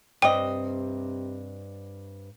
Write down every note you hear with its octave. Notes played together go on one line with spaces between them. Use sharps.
G2 C3 G3 C4 D#5 G5